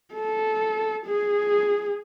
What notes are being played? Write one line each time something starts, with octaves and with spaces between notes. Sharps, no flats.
A4
G#4